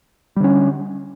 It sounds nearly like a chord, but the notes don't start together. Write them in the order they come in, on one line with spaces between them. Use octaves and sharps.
G3 D3 C#4